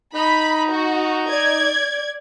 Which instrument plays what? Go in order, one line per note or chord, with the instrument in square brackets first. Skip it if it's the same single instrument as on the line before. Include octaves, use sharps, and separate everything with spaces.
[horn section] D#4 [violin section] B5
[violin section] F#4
D5 G#6